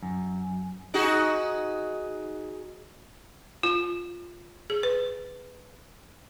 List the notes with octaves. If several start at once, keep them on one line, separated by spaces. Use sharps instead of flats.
F#2
D#4 F#4 G#4
F4
G#4
B4